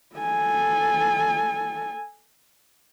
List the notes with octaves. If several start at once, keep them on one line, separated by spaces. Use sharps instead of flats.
A4 G#5